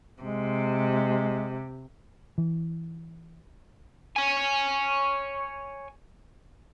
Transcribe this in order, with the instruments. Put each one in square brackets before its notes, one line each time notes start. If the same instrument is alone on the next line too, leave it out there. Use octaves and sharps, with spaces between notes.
[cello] C3 [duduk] G#3
[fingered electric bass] E3
[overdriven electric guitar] C#5 G#5